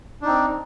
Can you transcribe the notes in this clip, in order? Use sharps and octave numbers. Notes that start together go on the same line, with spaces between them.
C4 D4 D#4